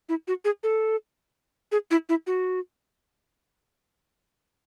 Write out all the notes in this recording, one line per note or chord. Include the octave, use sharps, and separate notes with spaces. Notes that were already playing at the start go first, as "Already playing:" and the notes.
E4
F#4
G#4
A4
G#4
E4
E4
F#4